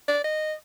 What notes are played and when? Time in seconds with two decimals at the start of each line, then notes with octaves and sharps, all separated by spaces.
0.08 D5
0.24 D#5